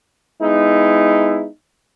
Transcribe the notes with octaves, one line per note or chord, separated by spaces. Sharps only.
G#3 B3 D#4 E4